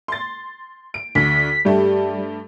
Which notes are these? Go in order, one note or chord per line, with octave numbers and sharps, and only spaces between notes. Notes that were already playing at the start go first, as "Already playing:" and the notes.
C6 A6
D7
D2 B6
G2 G3 A3